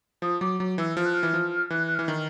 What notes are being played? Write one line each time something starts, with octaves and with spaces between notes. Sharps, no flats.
F3 D#6
F#3 D6
F#3
E3 E6
F3 F6
F#6
F6
E3
F3
E3 F#6
F#6
E3 F6
D#3